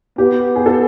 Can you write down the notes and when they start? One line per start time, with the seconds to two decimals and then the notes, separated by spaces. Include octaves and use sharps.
0.18 B3 G4
0.56 G#4
0.66 A4